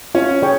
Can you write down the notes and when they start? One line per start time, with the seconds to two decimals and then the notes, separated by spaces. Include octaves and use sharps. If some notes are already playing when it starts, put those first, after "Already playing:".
0.15 C#4 F4
0.42 G#4 C#5 G5 C#6